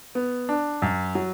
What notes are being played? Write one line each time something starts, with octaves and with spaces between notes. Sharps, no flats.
B3
D4
F#2
F#3